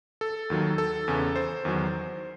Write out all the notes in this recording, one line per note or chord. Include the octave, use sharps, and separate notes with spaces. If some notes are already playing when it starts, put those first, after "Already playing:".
A4
D#2 D#3 F#3
A4
E2 C#3 E3
C5
E2 D#3 F#3